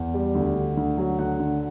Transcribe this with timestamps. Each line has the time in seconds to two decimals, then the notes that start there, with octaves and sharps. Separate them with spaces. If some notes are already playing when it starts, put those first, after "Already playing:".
Already playing: E2
0.14 G3
0.35 D2
0.56 D3
0.77 D2
0.98 F#3
1.19 D2 F#5
1.39 D3